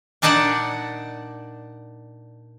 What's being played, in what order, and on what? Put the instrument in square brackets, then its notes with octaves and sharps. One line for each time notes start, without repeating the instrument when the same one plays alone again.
[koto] A#2 D4 D#4 D5 F#5 A5